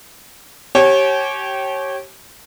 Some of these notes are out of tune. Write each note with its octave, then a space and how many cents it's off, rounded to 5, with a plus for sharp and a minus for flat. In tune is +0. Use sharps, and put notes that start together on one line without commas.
G4 -25 C#5 -25 G#5 +45